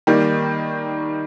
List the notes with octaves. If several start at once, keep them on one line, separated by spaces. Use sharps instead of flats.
D#3 G3 A#3